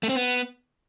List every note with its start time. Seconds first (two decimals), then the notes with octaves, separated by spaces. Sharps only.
0.03 A3
0.09 C4
0.15 B3